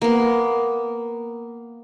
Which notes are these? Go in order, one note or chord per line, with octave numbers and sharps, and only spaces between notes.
A#3 B3